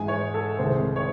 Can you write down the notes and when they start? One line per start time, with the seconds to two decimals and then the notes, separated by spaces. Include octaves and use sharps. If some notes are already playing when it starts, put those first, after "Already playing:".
Already playing: G#2 E3 G#3 G#5
0.08 C#5
0.34 A4
0.59 C2 C3 D#3 G#3 C5
0.96 C#5